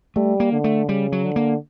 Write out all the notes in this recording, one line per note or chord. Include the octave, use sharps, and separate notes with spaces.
G3 A3
A#3
D3
A3
C#3 G3
F#3
D3
A#3